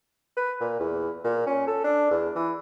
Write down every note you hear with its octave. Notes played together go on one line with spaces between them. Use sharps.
B4
A#2
E2
A#2
C#4
A4
D4
E2
E3